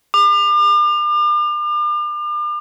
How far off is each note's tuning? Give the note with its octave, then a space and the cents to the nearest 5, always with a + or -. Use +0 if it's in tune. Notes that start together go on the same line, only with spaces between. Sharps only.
D6 +40